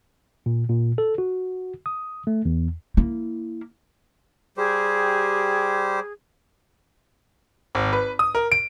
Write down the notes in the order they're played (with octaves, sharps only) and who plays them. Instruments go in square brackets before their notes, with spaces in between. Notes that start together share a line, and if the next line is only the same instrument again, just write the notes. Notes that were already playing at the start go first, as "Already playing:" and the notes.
[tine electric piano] A#2
A#2
A4
F#4
D#6
A3
E2
[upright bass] A#3 E4
[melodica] G3 G4 C5 [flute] G#4
[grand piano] G#1
B4
D#6
A#4
D7